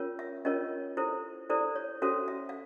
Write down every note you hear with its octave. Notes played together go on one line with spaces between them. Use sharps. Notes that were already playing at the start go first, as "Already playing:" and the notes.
Already playing: C#4 F4 A#4 C#5
E5
C#4 F4 A#4 C#5 D#5
E4 A4 C5
E4 A4 C5 D5
C#5
C#4 F#4 A4 C5 E5
E5
F5